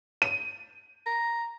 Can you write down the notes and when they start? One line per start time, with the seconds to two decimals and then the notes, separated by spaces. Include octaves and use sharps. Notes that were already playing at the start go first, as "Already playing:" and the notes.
0.22 D#7
1.06 A#5